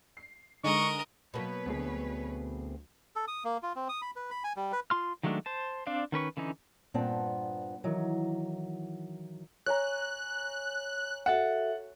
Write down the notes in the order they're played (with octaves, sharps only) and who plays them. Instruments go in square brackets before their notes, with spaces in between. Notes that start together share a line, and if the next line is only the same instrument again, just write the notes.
[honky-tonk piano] C7
[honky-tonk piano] D3 G#3 D#4 [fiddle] A#4 D#5 [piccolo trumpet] C#6
[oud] B2 A#3 [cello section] F#3 B4 C#5
[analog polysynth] D2 [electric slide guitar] B3 C4 G#4
[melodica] A4
D#6
A#3
F4
C4
D#6
B5
B4
B5
G#5
G3
B4
[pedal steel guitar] F4 C6 F6
D#3 F#3 G#3 A3 D4
C5 A5
C4 D4 D5 F5
D#3 C#4 B4 C#6
D3 E3 C#4 D#4
[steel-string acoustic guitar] G2 A#2 B3 C4 F#5 A5
D#3 E3 F#3
[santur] C#5 G#5 A#5 [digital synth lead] F#6
[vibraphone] F#4 A4 E5 [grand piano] F#5